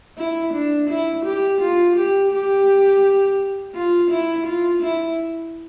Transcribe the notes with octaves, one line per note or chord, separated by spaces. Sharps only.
E4
D4
E4
G4
F4
G4
G4
F4
E4
F4
E4